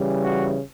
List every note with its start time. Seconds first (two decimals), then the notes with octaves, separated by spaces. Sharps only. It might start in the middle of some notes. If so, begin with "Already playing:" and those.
Already playing: C#3 E3 G3
0.21 F#4